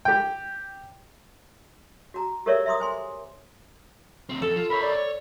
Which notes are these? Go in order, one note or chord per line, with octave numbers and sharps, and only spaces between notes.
G4 G5
F#4 A#5
G4 A4 A#4 C#5 D5 E5
E5 A#5 C6 D6 D#6
C5 G#5 C6
D2 C4
F2 A4
F4
A#4 C#5 B5
D5
C#5